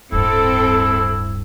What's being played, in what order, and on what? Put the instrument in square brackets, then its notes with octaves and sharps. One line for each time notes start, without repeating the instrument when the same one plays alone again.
[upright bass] D1 G2 [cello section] C4 A4 [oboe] E4